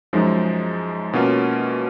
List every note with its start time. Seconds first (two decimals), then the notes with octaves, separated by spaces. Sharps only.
0.13 F#2 F3 G#3 D#4
1.13 B2 A#3 C#4 F4